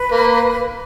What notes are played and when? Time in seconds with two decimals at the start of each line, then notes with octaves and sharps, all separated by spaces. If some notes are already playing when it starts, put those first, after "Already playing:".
Already playing: B4
0.12 A#3